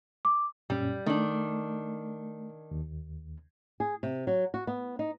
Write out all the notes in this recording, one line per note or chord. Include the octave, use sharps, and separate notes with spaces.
D6
F#2 A#2 G3 C#4
D#3 A3 D4
D#2
G#4
C3
F#3
F#4
B3
D#4